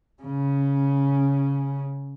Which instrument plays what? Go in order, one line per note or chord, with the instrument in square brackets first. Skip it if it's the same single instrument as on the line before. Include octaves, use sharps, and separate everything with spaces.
[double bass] C#3 C#4